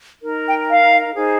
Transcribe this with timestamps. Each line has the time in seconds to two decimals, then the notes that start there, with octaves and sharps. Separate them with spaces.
0.23 D#4 A#4
0.47 G5
0.69 F5
1.15 D#4 G#4 C5